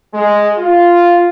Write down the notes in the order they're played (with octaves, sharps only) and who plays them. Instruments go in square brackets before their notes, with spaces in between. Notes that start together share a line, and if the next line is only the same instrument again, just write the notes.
[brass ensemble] G#3
F4